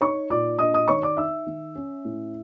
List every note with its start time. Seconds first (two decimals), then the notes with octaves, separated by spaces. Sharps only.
0.01 D#4 C#5 C#6
0.30 A#2 D5 D6
0.59 D4 D#5 D#6
0.74 D#5 D#6
0.88 D#3 C#5 C#6
1.02 D5 D6
1.17 D#4 E5 E6
1.46 D#3
1.75 C#4
2.05 A2